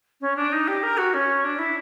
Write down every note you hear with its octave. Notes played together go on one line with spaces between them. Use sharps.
C#4
D4
D#4
G4
A#4
F#4
C#4
D4
E4